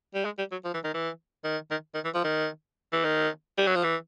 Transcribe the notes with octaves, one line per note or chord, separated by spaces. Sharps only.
G3
G#3
G3
F#3
F3
E3
D#3
E3
D#3
D#3
D#3
E3
F3
D#3
E3
D#3
G3
F#3
F3
E3